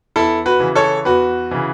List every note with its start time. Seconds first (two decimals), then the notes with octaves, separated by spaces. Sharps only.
0.16 E2 E4 A4
0.46 F#4 B4
0.60 C#3 E3
0.75 A4 C#5
1.05 E2 F#4 B4
1.51 C#3 E3